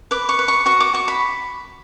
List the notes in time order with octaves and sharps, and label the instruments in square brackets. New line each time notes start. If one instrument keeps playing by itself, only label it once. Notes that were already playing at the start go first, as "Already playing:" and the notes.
[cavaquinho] B4 D6
C#6
B4
C#6
F#4 C#6
D6
F#4 C#6
B5